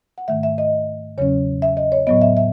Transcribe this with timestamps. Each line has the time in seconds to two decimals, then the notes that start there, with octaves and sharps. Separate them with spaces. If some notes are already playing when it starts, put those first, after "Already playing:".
0.18 F#5
0.28 G#2 D#3 A3 E5
0.43 E5
0.58 D#5
1.18 E2 C#3 F#3 C#4 C#5
1.62 E5
1.77 D#5
1.92 C#5
2.07 A2 F#3 B3 D#5
2.22 E5
2.37 E5